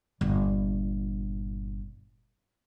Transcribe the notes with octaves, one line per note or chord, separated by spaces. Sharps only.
G1 A#2